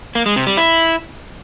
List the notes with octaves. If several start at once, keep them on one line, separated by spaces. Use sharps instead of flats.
A#3
G#3
C3
G3
E4